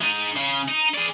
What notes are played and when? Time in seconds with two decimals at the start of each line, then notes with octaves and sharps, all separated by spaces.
0.01 G#3 D#4
0.36 C#3
0.68 D#4
0.94 G#4 D5